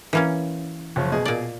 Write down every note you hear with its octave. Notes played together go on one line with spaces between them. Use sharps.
E3 A#3 C#4
F#1 F3 C#5
B2 G#4 D#5
A#2 D5